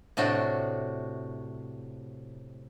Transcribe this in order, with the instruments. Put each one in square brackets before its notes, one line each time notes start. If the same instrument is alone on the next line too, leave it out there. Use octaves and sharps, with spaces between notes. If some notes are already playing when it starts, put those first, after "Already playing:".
[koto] A2 C3 D4 F#4